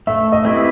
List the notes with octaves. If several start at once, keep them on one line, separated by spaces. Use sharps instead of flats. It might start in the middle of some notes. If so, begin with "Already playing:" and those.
A3 E5
D#5
C4 E4 G4 B4